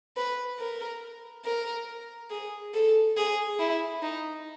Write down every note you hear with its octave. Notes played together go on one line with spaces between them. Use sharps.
B4
A#4
A#4
G#4
A4
G#4
E4
D#4